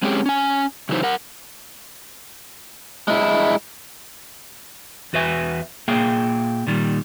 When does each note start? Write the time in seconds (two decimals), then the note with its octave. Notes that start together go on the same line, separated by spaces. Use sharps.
0.03 G#3 C4 C#4 G4 G#4
0.26 C#4 G#5
0.89 C#3 E3 F#3 D#4 C5
1.03 A#4 F#5
3.08 G#3 E4
5.13 E2 F#4 B4 E5 G#5
5.88 A#2 A#3 G#4 E5 G5
6.67 A#2 D#3 G3